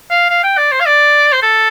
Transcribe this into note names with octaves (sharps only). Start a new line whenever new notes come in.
F5
F5
G5
D5
C5
F5
D5
C5
A4